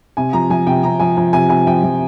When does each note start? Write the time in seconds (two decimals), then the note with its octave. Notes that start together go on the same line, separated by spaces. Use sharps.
0.17 C3 G#5
0.33 F3 A#5
0.50 F3 G#5
0.67 C3 G5
0.83 C3 A#5
1.00 F3 G#5
1.17 F3 G#5
1.33 C3 G#5
1.49 C3 G#5
1.67 F3 G5
1.84 F3